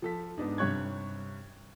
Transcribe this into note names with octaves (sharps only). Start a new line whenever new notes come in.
F3 A4 B6
G#2 B3 D4 D#4
G2 C3 C#5 C#6 F#6 G#6